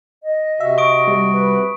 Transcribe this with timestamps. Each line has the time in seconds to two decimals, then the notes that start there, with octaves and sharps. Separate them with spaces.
0.23 D#5
0.60 C3 F#4 E5
0.78 C#6 D#6 D7
1.08 G3
1.33 B4